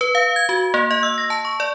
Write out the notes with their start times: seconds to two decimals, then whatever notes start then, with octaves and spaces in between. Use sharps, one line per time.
0.01 B4
0.15 F5
0.36 G#6
0.49 F#4
0.74 A#3
0.91 D#5
1.03 E6
1.18 A#6
1.30 A5
1.45 C#6
1.60 D5